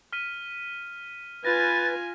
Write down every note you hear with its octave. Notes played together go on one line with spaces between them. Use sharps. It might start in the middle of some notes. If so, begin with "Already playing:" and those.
F6 B6 D#7
F4 B4 G#5 A6 A#6